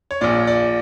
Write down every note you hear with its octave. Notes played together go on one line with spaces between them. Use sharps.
C#5
A#1 A#2 D5
D5